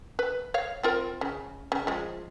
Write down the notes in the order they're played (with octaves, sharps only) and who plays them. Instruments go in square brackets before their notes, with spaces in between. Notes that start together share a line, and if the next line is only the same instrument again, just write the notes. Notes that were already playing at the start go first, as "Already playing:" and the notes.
[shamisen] B4
C#5 F5
C4 F4 A#4
C#3
C#3
F3 G#3